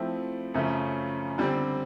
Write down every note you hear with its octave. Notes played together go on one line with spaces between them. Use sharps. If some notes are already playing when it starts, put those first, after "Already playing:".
Already playing: F3 A3 C4 E4
F#2 C#3 F3 A3 C#4
D3 G3 C4